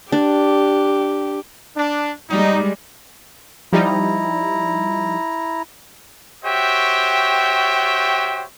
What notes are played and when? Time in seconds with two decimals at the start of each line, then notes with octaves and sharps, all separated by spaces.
0.12 D4 G4
1.76 D4
2.30 G3 G#3 D#4
3.72 F3 G3 D#4 E4 A#5
6.45 F#4 G4 C5 C#5 E5 G5